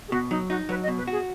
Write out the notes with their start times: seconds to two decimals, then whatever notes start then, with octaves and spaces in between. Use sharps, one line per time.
0.08 G#4
0.12 B2 F#4
0.30 F#3 D#4
0.49 D#4 F#4
0.69 F#3 B4
0.83 D#5
0.88 B2
0.98 B4
1.08 F#4 G#4